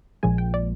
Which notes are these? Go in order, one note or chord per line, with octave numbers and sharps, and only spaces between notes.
A#1 A#2 F3 G#3 G#5
G5
D5